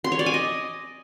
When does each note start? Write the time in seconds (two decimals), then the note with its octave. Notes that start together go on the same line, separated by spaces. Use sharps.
0.04 C6
0.12 C#5
0.19 D5
0.26 G#5
0.34 D#5